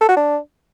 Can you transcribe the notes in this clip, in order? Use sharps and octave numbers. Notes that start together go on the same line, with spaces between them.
A4
F#4
D4